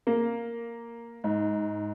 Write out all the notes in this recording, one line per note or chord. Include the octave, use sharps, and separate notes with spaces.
A#3
G#2